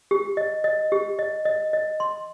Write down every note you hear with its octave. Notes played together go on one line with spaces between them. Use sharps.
G4
D#5
D#5
G4
D#5
D#5
D#5
C6